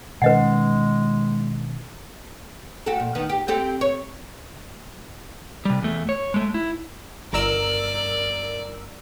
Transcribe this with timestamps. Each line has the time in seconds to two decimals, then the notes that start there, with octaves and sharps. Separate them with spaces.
0.22 B2 D#3 G#3 C#4 B4 D#5 F#5
2.86 F#4 G4 A4
3.00 A#2
3.15 D#3 B3
3.29 G4
3.48 C4 G4 A4
3.81 C#5
5.65 C3 G3
5.82 E2 A3
6.09 C#5
6.34 G#3 A3
6.54 E4
7.33 G1 A#4 D5 E6